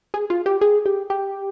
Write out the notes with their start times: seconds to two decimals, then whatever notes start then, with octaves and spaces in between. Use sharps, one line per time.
0.14 G#4
0.30 F4
0.46 G4
0.61 G#4
0.86 G4
1.10 G4